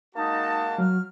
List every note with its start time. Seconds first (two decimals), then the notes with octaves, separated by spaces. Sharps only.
0.15 G#3 A#3 D#4 F#4 A5
0.78 F#3 F6